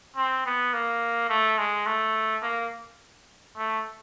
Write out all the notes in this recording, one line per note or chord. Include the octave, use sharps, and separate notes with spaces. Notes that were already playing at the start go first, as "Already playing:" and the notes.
C4
B3
A#3
A3
G#3
A3
A#3
A3